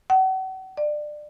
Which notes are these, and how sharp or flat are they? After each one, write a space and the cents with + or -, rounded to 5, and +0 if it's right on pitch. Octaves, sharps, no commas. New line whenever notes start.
F#5 +40
D5 +25